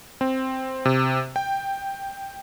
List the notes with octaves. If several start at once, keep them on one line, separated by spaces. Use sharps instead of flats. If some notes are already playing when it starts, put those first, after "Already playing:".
C4
C3
G5